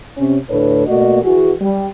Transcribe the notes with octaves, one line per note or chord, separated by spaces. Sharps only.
C3 C#4
D2 A2 D4 A4 B4 C#5
B2 A3 A#3 F#4 D5 D#5
E3 F#4 G#4
G3